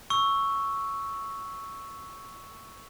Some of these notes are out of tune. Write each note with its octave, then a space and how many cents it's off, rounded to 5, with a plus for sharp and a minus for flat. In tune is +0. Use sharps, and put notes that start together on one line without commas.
C#6 +0 E6 +0